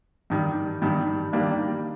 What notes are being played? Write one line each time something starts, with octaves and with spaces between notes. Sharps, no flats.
G2 D#3 G3
G2 D#3 G3
D#3 G3 A#3 D4